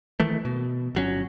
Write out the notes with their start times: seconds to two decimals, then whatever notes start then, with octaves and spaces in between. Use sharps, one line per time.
0.20 D#3 E3 A3
0.45 B2
0.95 G1 F#3 C#4